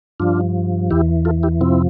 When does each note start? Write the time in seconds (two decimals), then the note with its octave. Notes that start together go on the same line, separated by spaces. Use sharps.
0.20 G2 F3 D4 F4
0.91 E2 E3 E4 G4
1.25 F4 A4
1.43 E4 G4
1.61 F2 C3 F3 C4 E4